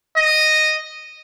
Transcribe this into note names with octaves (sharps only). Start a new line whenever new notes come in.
D#5